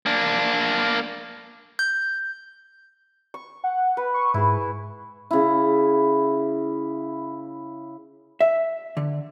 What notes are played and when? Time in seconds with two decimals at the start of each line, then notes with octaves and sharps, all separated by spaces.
0.06 A#3 D4
1.79 G6
3.34 C#6
3.64 F#5
3.97 B4
4.14 C#6
4.34 G#2 E4 G#4
5.31 C#3 E4
8.41 E5
8.97 D3